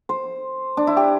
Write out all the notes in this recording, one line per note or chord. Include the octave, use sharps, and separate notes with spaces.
C5
D4
E4
G4